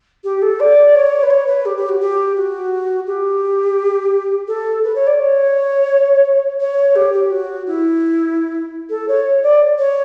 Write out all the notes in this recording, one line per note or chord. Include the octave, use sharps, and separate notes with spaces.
G4
A4
D5
C#5
B4
C#5
B4
G4
G4
F#4
G4
F#4
G4
A4
B4
C#5
D5
C#5
C#5
G4
G4
F#4
E4
A4
C#5
D5
C#5